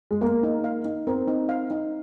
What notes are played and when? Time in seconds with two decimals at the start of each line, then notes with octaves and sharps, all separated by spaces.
0.11 G#3
0.21 A#3 A#4
0.43 D#4
0.64 F5
0.85 D#4
1.07 C4 A#4
1.28 D#4
1.49 F5
1.71 D#4